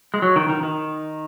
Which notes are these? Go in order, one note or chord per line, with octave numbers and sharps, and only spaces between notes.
G#3
F#3
D#3
D#3
D#3